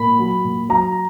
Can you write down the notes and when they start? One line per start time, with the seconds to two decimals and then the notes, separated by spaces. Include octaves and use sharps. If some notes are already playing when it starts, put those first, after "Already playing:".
Already playing: A#2 B5
0.19 F#3
0.44 A#2
0.69 F#3 A#5